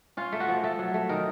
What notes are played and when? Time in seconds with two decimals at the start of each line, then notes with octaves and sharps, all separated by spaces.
0.17 C#4 F4
0.32 A3
0.40 F#4
0.48 F3
0.64 A3 A4
0.79 F#3
0.94 A3
1.09 D#3 A#4